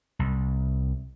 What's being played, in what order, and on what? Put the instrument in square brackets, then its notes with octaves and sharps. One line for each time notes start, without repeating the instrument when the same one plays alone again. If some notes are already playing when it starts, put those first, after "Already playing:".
[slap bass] C2